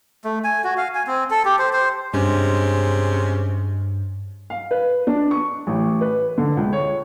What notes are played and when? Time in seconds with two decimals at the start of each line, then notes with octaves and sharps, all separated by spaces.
0.25 A3
0.44 G#5
0.64 F#4
0.78 F5
0.95 G#5
1.07 C4
1.31 A4
1.45 G4
1.59 C5
1.73 C5
2.14 G2 C3 G#3 C#4
4.50 F5
4.71 B4
5.07 D4
5.31 C#6
5.67 A1
6.01 B4
6.38 D3
6.57 C#2
6.73 C#5